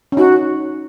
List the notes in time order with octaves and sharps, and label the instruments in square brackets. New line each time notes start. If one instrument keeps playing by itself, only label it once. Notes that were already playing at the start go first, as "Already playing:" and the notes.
[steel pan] C#4
[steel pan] D#4 [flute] F#4